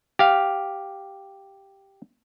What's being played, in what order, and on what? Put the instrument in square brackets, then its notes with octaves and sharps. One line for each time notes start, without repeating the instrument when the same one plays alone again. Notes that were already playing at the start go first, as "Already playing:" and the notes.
[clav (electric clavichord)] G4 F5